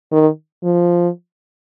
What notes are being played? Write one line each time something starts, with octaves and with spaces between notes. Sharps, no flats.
D#3
F3